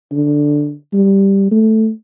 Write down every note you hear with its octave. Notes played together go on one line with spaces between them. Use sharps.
D3
G3
A3